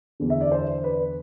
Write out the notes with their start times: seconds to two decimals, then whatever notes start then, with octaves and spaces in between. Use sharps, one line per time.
0.20 E2 D3
0.30 E5
0.41 D5
0.52 C5
0.84 B4